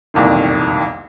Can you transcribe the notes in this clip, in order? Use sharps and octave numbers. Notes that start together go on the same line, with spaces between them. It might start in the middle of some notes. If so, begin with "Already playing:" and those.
E1 C2 F2 A#2 D#3